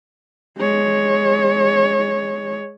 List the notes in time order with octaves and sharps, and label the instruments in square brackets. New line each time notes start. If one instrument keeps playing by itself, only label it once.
[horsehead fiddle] G#3 C#5